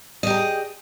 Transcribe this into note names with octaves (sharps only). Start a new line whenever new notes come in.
G4 G#4 A#4 D#5